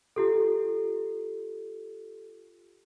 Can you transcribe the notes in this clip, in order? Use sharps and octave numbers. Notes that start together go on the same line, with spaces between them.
F4 G4 A4